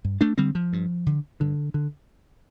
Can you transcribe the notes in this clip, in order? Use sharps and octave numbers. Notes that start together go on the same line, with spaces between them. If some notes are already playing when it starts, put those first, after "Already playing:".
G2
A3 D4
D3 G3 C4
F3
G2
D3
G2 D3
D3